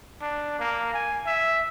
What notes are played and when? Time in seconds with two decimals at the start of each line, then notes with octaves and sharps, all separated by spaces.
0.22 D4
0.59 A#3
0.94 G#5
1.26 E5